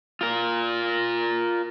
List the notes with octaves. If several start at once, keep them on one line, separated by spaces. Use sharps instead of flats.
F4 A#4